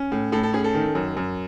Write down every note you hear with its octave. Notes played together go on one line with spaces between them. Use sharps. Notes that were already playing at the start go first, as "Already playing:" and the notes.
Already playing: C#4
A2
A2 A4
A4
C#4 G#4
A4
D#3
F#2
F#2